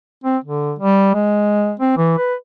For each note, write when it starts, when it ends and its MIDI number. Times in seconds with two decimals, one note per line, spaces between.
0.24 0.37 60
0.44 0.73 50
0.79 1.11 55
1.14 1.74 56
1.79 1.93 60
1.97 2.16 52
2.17 2.34 71